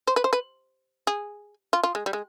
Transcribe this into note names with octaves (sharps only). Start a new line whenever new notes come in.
C5
B4
C5
B4
G#4
F4
F4
G#3
G3
G#3